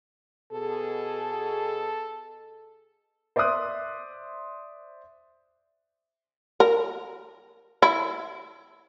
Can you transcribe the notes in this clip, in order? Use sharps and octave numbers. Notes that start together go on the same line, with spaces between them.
B2 G#4 A4
C5 D5 E5 C6 D#6 F#6
A#4
E4